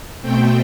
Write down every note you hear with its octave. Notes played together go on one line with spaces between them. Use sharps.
B2 A3 C4 G5